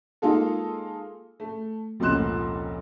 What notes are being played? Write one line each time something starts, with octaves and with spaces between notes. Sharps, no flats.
G#3 A#3 D#4 F4 G#4 A4
A3
F1 C#2 A#2 C6 F#6 E7